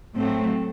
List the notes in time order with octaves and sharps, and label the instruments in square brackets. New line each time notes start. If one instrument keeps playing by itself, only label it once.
[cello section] A2 F#3 C4 [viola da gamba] A3